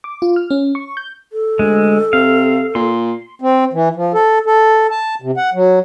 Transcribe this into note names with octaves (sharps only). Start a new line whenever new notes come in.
D6
F4
F6
C#4
C#6
G6
A4
D2 G#3
C3 F5
A#2 C6
C4
E3
F3
A4
A4
A5
C3
F#5
F#3